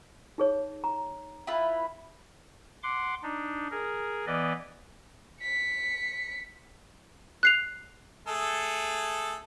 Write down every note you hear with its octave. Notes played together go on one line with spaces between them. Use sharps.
D#4 G#4 C#5
A#5
E4 F4 B4
F#5 C6 D6
D4 D#4
G#4 A#4
E3 B3 B4 D5 D#5
B6 C#7
F#6 C7 F7
A3 G#4 A4